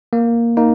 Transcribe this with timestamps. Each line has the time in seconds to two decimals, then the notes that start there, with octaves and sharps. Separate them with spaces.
0.13 A#3
0.57 A#3 D#4